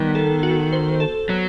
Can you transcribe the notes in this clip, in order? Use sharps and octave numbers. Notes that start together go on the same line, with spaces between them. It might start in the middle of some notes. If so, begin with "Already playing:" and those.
Already playing: D#3 G3 B3
A4
F#4
C5
A4
F#3 B3